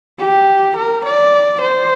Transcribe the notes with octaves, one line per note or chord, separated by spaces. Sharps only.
G4
A#4
D5
C5